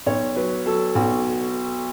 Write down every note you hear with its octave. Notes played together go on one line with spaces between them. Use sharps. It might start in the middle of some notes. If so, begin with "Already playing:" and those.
B1 C#5
F#3 B4
F#3 A4
B1 F#4